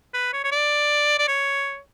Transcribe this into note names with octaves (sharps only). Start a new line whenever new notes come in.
B4
C#5
C#5
D5
D5
C#5